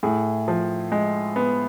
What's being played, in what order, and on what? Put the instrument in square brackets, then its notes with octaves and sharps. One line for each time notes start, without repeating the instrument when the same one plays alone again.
[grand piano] A2 G#4
F3
G#3
B3